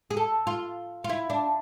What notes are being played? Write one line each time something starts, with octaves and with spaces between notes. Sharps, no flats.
G#4
A4
F4
F4
E4
D4